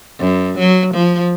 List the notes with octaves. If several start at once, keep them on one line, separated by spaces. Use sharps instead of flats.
F#2
F#3
F3